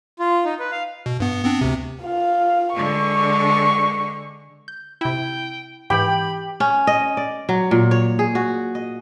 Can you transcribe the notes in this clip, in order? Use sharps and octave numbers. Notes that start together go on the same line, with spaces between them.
F4
D#4
B4
F5
B2
G2 B3
B3 C4 D4
D2 C3
F4 F5
D3 G#3 C#6
G6
C3 E4 G5
G#2 E3 G4 G5 B5
C#4
D#5
D5
F#3
A#2
C#5
G#4
F#4
D#5